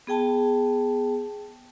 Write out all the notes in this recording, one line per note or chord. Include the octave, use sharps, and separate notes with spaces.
B3 G#4 G5 A5